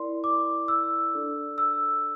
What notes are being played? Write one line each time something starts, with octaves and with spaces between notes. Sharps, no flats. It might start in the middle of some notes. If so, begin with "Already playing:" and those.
Already playing: E4 A#4 D5 C6
D6
E6
D4 A4 D5
E6